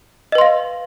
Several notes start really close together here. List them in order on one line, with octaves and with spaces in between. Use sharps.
D#5 B4 C6 F5